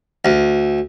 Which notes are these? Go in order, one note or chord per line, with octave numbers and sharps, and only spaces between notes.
D2